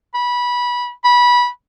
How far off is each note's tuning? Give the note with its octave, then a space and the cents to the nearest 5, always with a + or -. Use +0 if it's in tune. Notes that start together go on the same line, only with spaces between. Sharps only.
B5 -20
B5 -20